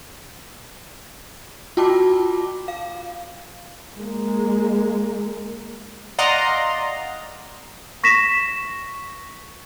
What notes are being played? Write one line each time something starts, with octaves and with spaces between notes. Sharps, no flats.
F4 F#4 G5 A5 D6
F5
G#3 A#3
D5 D#5 F5 F#5 A#5 C6
C#6 A#6 B6 E7